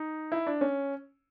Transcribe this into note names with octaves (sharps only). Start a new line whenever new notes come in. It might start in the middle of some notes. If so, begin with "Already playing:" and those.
Already playing: D#4
E4
D4
C#4